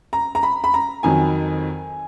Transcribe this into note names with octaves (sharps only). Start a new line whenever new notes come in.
A#5
A#5
B5
B5
A#5
F2 D#3 F#3 G#5